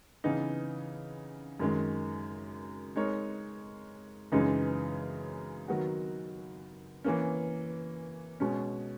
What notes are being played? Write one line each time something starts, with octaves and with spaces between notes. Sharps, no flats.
C#3 E3 B3 D#4
F#2 D#3 G#3
G#3 D#4 A#4 C#5
F#2 C#3 E3 G#3 D#4
D#3 F#3 B3 F#4
E3 A#3 C#4
B2 G#3 C#4